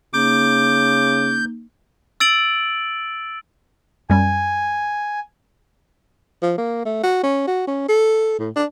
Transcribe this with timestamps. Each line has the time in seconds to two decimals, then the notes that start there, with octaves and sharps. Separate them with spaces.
0.14 C#3 A#3 D#4 D6 G6
2.20 E6 A6 D7 F#7
4.10 F#2 G3 G#5
6.42 F3
6.58 A#3
6.85 A3
7.03 F#4
7.23 C#4
7.47 F#4
7.67 C#4
7.89 A4
8.39 A2
8.56 D4